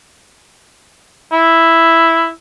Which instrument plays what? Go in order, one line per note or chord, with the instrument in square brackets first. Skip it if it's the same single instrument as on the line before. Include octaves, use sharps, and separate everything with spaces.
[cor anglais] E4